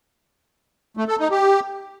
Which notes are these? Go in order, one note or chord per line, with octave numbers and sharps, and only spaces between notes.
A3
A4
D#4
G4